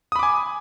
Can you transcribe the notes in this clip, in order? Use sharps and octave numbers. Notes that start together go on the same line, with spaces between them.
G#5 B5 D6 D#6